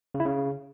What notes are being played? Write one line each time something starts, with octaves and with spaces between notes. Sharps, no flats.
C#3
E4
C#3